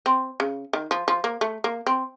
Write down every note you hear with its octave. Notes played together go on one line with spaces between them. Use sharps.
C4
C#3
D#3
F3
F3
A#3
A3
A#3
C4